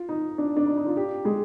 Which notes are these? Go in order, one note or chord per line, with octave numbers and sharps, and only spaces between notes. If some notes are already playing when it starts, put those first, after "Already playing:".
Already playing: F4
D#4
D4
D4
D#4
D#4
F4
G4
G#3